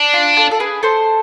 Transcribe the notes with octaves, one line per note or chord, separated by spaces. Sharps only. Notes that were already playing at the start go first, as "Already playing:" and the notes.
Already playing: D4
F4
F4 A4
A4
G#4 B4
A4 C5